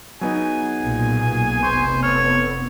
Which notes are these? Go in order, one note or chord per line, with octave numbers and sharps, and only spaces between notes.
F#3 B3 D#4 G#4 G#5
B1 A#2
F1 B3 C5 C#6
A4 C#5 F6